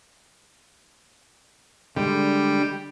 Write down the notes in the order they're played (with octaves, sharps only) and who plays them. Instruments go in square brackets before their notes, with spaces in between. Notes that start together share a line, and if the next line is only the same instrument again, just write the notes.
[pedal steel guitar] D3 G#3 D4 [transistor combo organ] G3